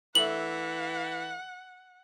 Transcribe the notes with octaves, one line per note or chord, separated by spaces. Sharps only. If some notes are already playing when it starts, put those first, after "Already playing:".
E3 A3 D4 A4 F#5 F#7